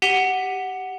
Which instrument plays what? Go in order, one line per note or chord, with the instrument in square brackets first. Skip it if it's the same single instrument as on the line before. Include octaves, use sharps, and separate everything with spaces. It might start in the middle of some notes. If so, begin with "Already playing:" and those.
[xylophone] G4 F#5 B6 D#7 F7 G7